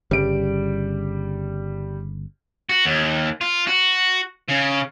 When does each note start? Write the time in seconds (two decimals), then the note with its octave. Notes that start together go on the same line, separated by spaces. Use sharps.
0.11 G1 C#3 G3 D7
2.69 F#4
2.85 D#2
3.41 F4
3.67 F#4
4.49 C#3